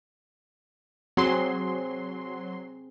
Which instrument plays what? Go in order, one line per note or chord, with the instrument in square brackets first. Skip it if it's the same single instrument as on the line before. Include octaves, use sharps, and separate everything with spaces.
[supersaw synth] F#3 C6 [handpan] C4 G#4